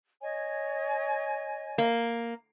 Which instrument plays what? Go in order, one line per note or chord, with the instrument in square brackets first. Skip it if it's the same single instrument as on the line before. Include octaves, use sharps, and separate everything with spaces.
[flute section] C#5 D#5 G#5
[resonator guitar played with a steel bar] A#3